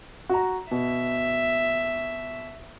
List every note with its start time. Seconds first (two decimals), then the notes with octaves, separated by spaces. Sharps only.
0.29 F#4 A#5
0.71 B2 E5